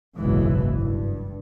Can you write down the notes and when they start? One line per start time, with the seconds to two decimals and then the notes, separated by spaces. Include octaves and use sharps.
0.17 F#1 B1 G#2 B2 E3
0.78 G2